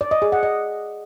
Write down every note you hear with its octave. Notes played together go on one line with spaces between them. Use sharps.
D5
D#5
G#4
F#5
D#5